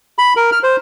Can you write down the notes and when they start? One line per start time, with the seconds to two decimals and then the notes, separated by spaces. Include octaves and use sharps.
0.18 B5
0.37 A#4
0.52 F6
0.63 C5